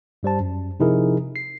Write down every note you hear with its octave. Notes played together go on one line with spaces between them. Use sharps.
G2 G3 C5 A5
F#2
C3 F3 D#4 E4 G#4 A#4
C7